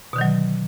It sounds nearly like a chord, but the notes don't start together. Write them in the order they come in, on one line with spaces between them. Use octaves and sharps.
B2 D3 D#3 F#3